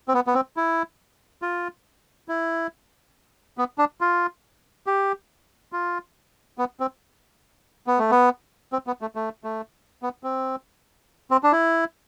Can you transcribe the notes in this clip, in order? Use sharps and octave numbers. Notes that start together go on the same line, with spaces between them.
C4
B3
B3
C4
E4
F4
E4
B3
D4
F4
G4
F4
B3
C4
B3
A3
B3
C4
B3
A3
A3
A3
B3
C4
C4
D4
E4